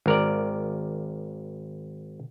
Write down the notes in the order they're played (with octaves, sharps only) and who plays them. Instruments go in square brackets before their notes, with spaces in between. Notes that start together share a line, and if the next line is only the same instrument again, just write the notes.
[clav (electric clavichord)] G#1 A#4 D5